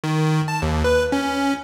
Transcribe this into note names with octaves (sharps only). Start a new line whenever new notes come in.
D#3
A5
D#2
B4
C#4